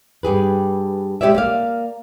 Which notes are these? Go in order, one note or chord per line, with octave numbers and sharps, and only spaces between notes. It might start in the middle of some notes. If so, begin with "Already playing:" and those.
G2 G4 G#4 B4
G#3 G4 C#5 D5 E5
A#3 D5 F5